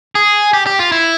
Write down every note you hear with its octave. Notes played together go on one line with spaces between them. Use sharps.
G#4
G4
G4
F4
E4